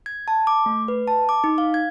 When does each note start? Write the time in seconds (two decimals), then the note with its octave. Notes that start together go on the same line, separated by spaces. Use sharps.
0.06 G#6
0.28 A5
0.47 D6
0.66 A3
0.88 B4
1.08 A5
1.29 D6
1.44 D#4
1.58 F5
1.74 G#6